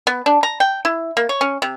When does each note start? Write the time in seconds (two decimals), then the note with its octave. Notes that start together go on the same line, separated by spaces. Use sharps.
0.07 B3
0.26 D4
0.43 A#5
0.60 G5
0.85 E4
1.17 A#3
1.29 C#5
1.41 C#4
1.62 C3